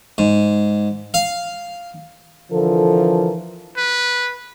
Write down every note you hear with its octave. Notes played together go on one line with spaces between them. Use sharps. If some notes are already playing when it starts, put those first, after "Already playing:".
G#2
F5
D3 E3 F3 A4 A#4
B4